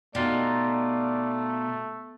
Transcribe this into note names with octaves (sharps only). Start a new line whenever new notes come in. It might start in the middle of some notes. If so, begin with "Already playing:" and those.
B2 A3 D#4 F4 G4 D5